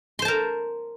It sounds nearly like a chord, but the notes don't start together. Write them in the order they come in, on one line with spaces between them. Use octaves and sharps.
C6 C5 A5 A#4